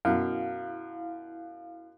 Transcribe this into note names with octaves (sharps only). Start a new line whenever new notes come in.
F#2 B2 E4 F5